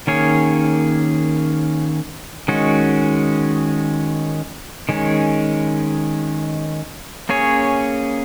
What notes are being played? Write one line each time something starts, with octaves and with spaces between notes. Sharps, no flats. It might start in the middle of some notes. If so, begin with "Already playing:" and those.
D#3 A#3 C#4 G#4 C#5
D#3 G#3 C#4 F#4
D#3 G#3 C#4
A#3 C#4 G#4 C#5